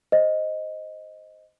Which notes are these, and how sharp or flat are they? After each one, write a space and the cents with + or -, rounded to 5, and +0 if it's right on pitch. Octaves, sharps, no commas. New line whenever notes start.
C5 +0 D#5 +0